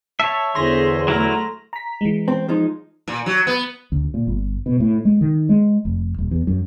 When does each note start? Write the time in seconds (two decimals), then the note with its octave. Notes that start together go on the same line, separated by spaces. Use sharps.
0.20 C#5 E5 A5
0.55 E2 D3 G#4 C5 C6 A#6
1.08 F#3 A3 E4 A#4 A#5
1.73 A#5 B6
2.01 E3 G#3
2.28 C4
2.48 F3 G#3 D#4
3.08 A#2
3.26 F#3
3.47 B3
3.92 D2
4.14 A#2
4.27 G1
4.66 B2
4.80 A2
5.05 G#3
5.21 D#3
5.49 G#3
5.85 F1
6.18 D#1
6.31 E2
6.47 F#2